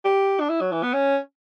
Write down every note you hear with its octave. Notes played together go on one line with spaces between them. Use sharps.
G4
D4
E4
F#3
E3
B3
C#4